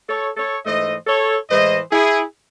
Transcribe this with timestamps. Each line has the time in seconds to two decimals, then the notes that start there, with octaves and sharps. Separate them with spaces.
0.09 A4 C#5
0.37 A4 C#5
0.66 G#2 E3 A3 C5 D#5
1.07 A4 C#5
1.50 A2 E3 G#3 C5 D#5
1.91 E4 G#4